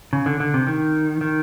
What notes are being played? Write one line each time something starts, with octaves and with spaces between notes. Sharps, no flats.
C#3
D3
D3
C3
D#3
D#3